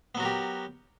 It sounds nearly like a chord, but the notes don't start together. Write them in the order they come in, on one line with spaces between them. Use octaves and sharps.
B3 F#3 F#4 A#4 G4